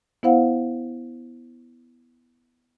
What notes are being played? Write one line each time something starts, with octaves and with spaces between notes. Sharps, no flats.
B3 E4 C5 F5 F#5